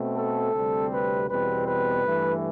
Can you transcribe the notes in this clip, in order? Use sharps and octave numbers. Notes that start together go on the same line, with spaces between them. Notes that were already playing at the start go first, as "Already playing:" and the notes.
Already playing: B2 A3 C4
A4
D2 C3 G3 C4
B4
E2 B2 G3 C4 B4
B4
G2 E3 A3